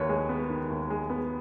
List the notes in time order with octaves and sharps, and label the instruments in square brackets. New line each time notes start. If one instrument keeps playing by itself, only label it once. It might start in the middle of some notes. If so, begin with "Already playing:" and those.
Already playing: [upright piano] D#2 D#3 B4 C#5
G#3
B3
D#3
D#2
G#3
B3